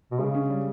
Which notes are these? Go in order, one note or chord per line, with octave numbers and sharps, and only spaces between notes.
B2
C#3 G#3
C#4
G3